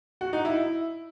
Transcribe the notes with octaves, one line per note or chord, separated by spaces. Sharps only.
F#4
D#4
E4